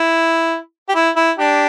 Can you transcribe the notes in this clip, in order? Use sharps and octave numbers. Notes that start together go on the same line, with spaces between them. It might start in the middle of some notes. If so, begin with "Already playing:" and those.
Already playing: E4
G4
E4
E4
D4 G4